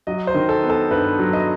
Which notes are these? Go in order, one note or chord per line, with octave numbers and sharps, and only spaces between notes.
F#3 D#5
C5
D#3
A4
B3
A4
G2 B4
F#3
D#5